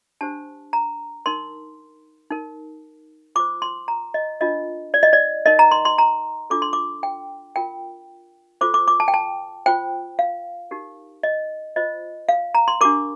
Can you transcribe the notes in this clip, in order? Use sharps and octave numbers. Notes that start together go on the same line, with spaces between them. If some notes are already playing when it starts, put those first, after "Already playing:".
D4 G4 C5 A5
A#5
D#4 A#4 C6
D#4 A#4
F4 C5 D6
C6
A#5
D#5
D4 F4 A#4 D#5
D5
D#5
D5
D#4 A#4 D#5
A#5
C6
C6
A#5
D4 F4 A4 D6
C6
D6
G5
F4 A#4 G5
F4 A4 C5 D6
D6
D6
A5
G5
A5
F4 C5 G5
F5
D#4 G4 A#4
D#5
F4 C5 D#5
F5
A#5
C6
D4 G4 A#4 D6